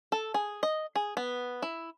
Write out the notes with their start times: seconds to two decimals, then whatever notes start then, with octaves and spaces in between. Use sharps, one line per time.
0.12 A4
0.34 G#4
0.63 D#5
0.96 G#4
1.17 B3
1.62 E4